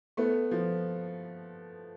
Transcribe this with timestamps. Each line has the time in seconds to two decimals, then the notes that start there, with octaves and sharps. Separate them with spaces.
0.17 A3 B3
0.51 F3